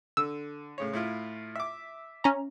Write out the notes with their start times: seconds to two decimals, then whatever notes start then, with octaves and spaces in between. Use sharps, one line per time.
0.17 D3 E6
0.78 A2 C#3 C#5
0.93 A2 E4 F4
1.56 E5 D6
2.24 C#4 A#5